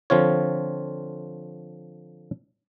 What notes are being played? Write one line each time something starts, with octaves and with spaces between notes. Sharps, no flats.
D3 F3 C4 F4 C#5